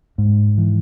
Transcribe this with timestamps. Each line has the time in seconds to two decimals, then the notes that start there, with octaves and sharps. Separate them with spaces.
0.18 G#2
0.58 E3